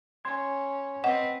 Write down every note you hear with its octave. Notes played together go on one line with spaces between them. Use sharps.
C#4 C6 G#6
C4 B4 D#5 F#5